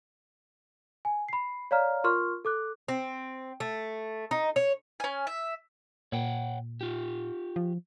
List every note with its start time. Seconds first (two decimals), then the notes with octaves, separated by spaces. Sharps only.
1.05 G#5
1.29 B5 C7
1.71 C#5 D5 F5 A#5 F6
2.04 F4 A#4 C6 C#6 F6
2.45 A4 D6 F#6
2.88 C4
3.60 A3
4.31 D#4
4.56 C#5
5.00 C#4 G#5
5.27 E5
6.12 A#2 C#5 F#5 G5
6.81 F4 G4
7.56 F3